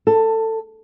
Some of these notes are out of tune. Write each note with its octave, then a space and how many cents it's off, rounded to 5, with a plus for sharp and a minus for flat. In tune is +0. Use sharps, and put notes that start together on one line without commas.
A4 +20